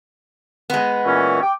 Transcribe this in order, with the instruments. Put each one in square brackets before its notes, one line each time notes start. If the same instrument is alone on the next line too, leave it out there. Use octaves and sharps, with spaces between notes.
[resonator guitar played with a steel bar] G#3 B3
[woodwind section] A#2 E3 C#4
G5 D6